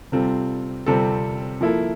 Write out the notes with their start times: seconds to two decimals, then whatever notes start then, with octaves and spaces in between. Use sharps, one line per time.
0.12 C3 G3 C4 F4 A4
0.86 C3 G3 C4 F4 A4
1.61 F3 A#3 E4 A4